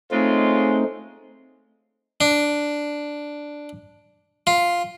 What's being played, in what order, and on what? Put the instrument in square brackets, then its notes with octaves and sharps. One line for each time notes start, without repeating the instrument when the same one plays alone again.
[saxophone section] C#3 G#3 F4 [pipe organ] A3 C4 D#4
[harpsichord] D4
F4